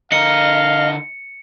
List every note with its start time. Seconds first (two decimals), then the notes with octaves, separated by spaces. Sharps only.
0.12 D3 A#4 D#5 F5 C#7